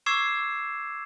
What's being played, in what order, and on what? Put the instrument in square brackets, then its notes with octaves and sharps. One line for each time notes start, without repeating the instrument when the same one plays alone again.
[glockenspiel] C#6 D6 E6 G#6 C7 E7